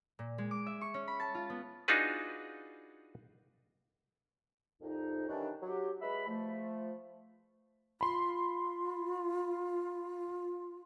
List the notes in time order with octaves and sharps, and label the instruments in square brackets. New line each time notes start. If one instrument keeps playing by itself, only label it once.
[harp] A#2
G#3
D6
E5
C#6
C#4
B5
A5
F4
B3
[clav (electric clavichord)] D4 D#4 F4 F#4 G#4 B4
[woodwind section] C2 F2 D#4
D#3 E3 G3 C#4 D4
F#3 G4
G#3 E4 B4 E5 B5
F3 A3
[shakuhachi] F4 [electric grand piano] B5 C6